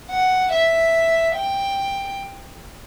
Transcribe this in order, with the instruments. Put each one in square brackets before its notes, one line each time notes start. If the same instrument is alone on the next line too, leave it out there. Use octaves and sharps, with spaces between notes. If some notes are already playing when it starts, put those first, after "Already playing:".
[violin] F#5
E5
G5